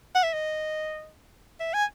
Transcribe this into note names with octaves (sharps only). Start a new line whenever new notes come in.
F#5
E5
D#5
E5
G#5